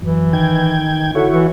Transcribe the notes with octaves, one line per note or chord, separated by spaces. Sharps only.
F#2 E3
D#3 G5 G#6
D3 E4 F#4 C#5
E3